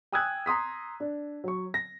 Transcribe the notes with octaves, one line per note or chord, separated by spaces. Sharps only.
G5 G#5 D#6 E6 F#6 G#6
A#5 C6 D#6 B6
D4
F#3 C#6
A#6